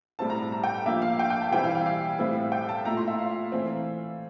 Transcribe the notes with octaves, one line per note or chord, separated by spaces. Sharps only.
A2 G3 C4 E4 A5
A#5
A#5
G5
F3 A#3 D4 E5
F5
G5
G5
A5
E3 G3 C4 E4 G5
F5
F5
F5
A2 G3 C4 E4
G5
A5
A#2 A3 E4 A#5
C6
E5
F5
E3 A3 C4